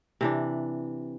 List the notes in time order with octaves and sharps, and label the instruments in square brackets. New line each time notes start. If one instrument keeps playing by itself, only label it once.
[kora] C3 E3 D4